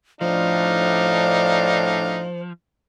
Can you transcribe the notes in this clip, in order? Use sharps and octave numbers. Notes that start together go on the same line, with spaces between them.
A2 F3 D4 D#4 C5 F5